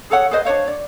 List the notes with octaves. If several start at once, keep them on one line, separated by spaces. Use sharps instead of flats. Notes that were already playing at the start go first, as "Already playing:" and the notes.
G#4 A4 C#5 F#5
G#4 B4 C5 D#5
D4 C5 C#5 F5
D5